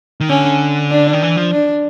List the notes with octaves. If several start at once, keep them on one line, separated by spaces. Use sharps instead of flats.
D#3
D3 C#4
D4
D#3
E3
F3
D4